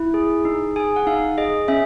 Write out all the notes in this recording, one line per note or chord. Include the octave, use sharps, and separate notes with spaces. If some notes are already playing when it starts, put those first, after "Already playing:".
Already playing: E4
G#4
D#4
G#4 G#5
F#5
D#4 F5
G#4 D#5
C#4 E5